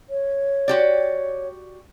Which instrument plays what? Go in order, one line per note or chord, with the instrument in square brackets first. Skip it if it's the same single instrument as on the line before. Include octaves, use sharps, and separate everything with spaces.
[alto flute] C#5
[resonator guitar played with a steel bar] F#4 G4 D5